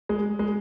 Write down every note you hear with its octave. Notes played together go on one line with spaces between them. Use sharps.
G#3
G#3